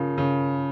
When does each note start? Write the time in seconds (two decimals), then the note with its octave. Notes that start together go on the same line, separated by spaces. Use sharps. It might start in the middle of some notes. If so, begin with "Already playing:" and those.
Already playing: C#3 F3 A#3
0.18 C#3